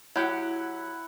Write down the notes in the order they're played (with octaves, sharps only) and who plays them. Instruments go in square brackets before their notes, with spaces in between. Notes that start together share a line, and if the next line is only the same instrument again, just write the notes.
[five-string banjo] F#3 G4 [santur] E4 F#5